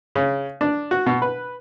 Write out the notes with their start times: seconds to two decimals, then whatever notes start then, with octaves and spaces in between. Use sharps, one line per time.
0.15 C#3
0.61 D4
0.91 F#4
1.06 B2
1.22 B4